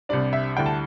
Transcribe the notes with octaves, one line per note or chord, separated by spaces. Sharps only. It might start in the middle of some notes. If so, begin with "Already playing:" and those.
C2 C3 G3 D4 D5
E5
D2 D3 G3 E4 G5
A5